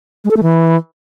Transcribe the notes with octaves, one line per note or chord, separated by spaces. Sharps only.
G#3
A4
A3
E3